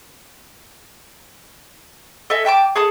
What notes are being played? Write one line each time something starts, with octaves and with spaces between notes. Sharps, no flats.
A4 D#5 E5 G#5
E5 G5 A5 D6
G#4 A4 A5 D#6